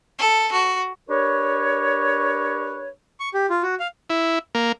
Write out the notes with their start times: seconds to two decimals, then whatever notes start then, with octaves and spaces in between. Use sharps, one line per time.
0.19 A4
0.52 F#4
1.09 D4 G4 A#4 B4 C#5
3.20 C#6
3.34 G4
3.50 F4
3.63 F#4
3.80 F5
4.10 E4
4.55 A#3